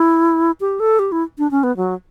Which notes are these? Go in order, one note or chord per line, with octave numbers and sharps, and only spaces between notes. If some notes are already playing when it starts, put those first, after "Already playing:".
Already playing: E4
G4
A4
G4
E4
D4
C#4
B3
F#3